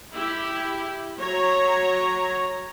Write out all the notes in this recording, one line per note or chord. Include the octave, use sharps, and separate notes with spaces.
E4 G4
F#3 C#5 A#5